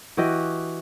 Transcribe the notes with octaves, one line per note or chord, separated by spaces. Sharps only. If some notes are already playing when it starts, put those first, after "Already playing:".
E3 F#4 G4 D#5